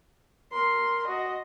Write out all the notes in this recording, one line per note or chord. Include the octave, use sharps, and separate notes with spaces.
A#4 C6
F#4 D#5